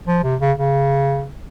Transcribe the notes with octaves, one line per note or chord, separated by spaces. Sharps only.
F3
C3
C#3
C#3